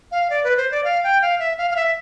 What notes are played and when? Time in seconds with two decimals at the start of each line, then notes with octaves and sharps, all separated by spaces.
0.12 F5
0.30 D5
0.44 B4
0.57 C5
0.71 D5
0.84 F5
1.04 G5
1.22 F5
1.39 E5
1.58 F5
1.71 F5
1.76 E5